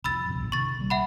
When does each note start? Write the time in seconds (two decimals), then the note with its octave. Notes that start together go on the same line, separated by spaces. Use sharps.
0.04 C2 F2 B5 E6 A6
0.25 G1 C#2 B2
0.40 A#1 F#2 A2
0.52 C3 D#3 C#6 A6
0.77 A#1 G3
0.90 E5 F#5 B5